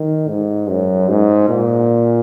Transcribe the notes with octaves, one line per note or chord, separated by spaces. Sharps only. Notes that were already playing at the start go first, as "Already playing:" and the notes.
Already playing: D#3
G#2
F#2
G#2
A#2